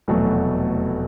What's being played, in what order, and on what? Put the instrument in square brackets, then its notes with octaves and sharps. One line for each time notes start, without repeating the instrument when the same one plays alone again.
[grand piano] F1 E2 B2 F#3 A3